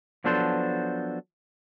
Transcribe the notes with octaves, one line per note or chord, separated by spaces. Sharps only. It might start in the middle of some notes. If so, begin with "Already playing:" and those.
F3 F#3 B3 D4 A4 C5